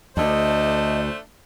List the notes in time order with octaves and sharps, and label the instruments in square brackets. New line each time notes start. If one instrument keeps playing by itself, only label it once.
[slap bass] D2 [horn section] A3 D4 C5 [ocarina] D#5